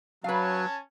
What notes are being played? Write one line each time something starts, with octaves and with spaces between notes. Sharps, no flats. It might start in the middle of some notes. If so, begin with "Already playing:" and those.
F#3 C#4 B4 F5 G#5 A5